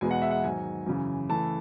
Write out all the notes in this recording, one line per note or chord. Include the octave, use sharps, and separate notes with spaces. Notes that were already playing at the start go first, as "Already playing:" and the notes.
E2 B2 G#3 B3 G#5
F#5
E5
F#5
G#2 D#3 F#3 G#5
F#2 C#3 E3
C#3 E3 A3 A5